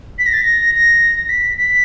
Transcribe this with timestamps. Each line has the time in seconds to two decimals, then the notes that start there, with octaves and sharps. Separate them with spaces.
0.19 B6
0.26 A#6
0.33 A6
0.41 A#6
0.74 A#6
1.29 B6
1.57 B6